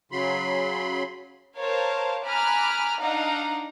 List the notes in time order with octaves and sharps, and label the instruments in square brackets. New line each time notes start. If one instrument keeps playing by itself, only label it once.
[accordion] C#3 F#3 B5 C6
[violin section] A#4 C5 C#5 F5 A5
G#5 A#5 B5 D6 F6 F#6
D4 D#4 F5 F#5 A#5